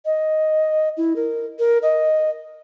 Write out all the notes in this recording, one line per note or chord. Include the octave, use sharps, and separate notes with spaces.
D#5
E4
A#4
A#4
D#5